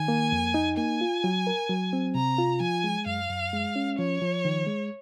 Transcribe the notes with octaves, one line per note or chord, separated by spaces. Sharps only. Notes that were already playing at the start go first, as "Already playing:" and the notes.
Already playing: D#3 G#5
A#3
F2
D#4
A#3 G#5
F4
F#3
A#4
F#3
C4
C3 A#5
F4
F3 G#5
G#3
F#2 F5
F#2
G#3
C#4
F3 C#5
F3
D#3
G#3